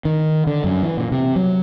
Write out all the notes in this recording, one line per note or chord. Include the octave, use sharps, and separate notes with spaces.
D#3
D3
F#2
E3
A#2
C3
F#3